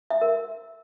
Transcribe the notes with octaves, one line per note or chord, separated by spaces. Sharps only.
E5
A#4